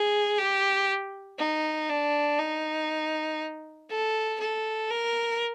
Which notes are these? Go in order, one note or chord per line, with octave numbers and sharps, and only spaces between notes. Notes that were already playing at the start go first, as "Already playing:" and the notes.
Already playing: G#4
G4
D#4
D4
D#4
A4
A4
A#4